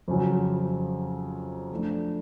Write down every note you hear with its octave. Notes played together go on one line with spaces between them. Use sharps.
F2 C#3 F#3
F3 A3 D4